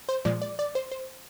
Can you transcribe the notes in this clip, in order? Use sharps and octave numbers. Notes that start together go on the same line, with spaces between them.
C5
A#2 F3 G#3 D5
D5
D5
C5
C5